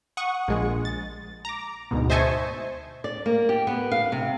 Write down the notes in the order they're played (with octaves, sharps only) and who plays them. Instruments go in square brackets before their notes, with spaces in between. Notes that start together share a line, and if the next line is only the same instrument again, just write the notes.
[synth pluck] F#5 C#6 D#6
A#1 G#3
A6
A#5 D6
D2 G#2 B2
C5 D#5 E5 G#5 A5 C#6
[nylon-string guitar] D5
A#3
G4
B3
F5
C3